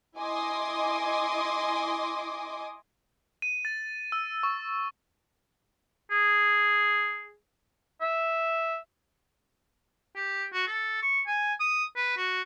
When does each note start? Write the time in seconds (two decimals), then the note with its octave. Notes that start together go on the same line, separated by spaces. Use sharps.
0.17 E4 D#5 G#5 C6 D6 D#6
3.42 D#7
3.65 A6
4.12 E6
4.43 C#6
6.11 G#4
8.01 E5
10.16 G4
10.53 F#4
10.67 A4
11.03 C#6
11.27 G#5
11.60 D#6
11.96 B4
12.18 F#4